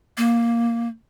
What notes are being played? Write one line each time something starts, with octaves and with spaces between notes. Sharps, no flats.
A#3